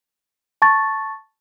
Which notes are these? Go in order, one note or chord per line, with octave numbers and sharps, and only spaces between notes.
A5 C#6 A6